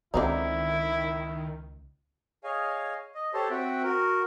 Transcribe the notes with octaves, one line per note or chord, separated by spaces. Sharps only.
C#2 D3 D#3 C4 D#4 E4
G#4 C#5 D#5 F5 G#5
D#5
G4 A4 C5 C#5 A5 C6
C4 F#4 E5 F#5 G5
F#4 A#4